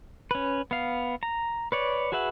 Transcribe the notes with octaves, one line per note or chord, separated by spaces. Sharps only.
C#4 B4
B3 F5
A#5
B4 C#5 D5
F#4 G#4 B4 E5 F#5